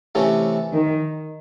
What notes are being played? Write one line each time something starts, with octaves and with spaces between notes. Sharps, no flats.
C3 E3 A3 C#4
D#3